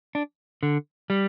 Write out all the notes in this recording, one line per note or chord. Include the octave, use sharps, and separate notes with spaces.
D4
D3
G3